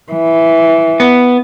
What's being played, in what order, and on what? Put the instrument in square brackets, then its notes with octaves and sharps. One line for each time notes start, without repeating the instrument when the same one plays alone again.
[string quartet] E3
[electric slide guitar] B3